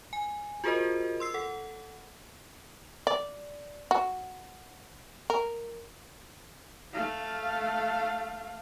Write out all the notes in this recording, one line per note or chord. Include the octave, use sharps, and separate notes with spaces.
G#5
F4 F#4 G#4 A#4 C5 D#5
C6 E6 C7
A4 F#5
D5
F#4
A#4
A3 F5